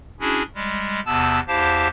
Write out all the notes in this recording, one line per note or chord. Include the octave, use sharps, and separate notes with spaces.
C#4 D4 E4 F#4 G#4
G3 G#3
E2 C3 B3 A5 E6
E2 E4 G4 C5 F5 A5